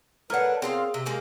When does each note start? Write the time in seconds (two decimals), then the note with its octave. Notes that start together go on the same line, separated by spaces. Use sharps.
0.30 A3 D4 A#4 B4 C#5 F#5
0.62 C4 F4 G#4 F5
0.94 C3
1.06 G#3 A#3 G4 G#4